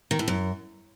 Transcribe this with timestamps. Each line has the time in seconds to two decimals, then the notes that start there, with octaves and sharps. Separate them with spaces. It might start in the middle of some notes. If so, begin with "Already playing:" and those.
0.11 D#3
0.19 A2
0.28 F#2